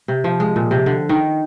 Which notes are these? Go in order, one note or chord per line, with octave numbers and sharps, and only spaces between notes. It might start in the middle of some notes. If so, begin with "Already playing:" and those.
C3
F3
G#3
A#2
C3
D3
D#3